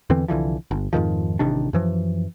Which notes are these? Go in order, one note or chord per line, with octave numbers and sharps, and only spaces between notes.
E2 D3 E3 C4
C2 D3 E3 F3
G1
F2 G#2 D#3 F3
A1 C3 D#3 D4
F#2 E3 F3